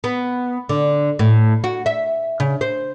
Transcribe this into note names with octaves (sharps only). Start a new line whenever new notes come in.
B3
D3
A2
F#4
E5
C#3
C5